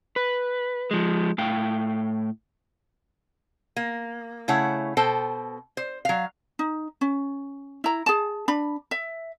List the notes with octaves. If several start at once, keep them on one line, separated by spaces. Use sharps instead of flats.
B4
F3 G#3
A2 F5 G5
A#3
C#3 A3 E4 C#5 F#5
B2 A4 C5 G5
C5
F#3 F5
D#4
C#4
E4 A#5
G#4 A5
D4 B5
E5